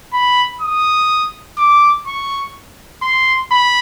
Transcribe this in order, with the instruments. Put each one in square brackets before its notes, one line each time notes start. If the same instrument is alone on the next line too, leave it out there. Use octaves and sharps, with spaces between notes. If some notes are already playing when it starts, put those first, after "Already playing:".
[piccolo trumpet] B5
D#6
D6
C#6
C6
B5